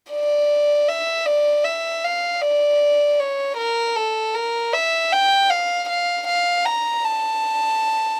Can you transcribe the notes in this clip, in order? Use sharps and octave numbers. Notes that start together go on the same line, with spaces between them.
D5
E5
D5
E5
F5
D5
C#5
A#4
A4
A#4
E5
G5
F5
F5
F5
A#5
A5